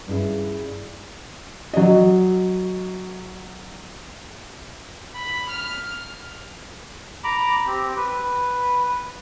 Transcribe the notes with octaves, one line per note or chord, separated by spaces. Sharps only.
G2 C#4 E4 G#4 F5
F#3 D#5
B5
F6
A#5 B5 D6
C4 G4
B4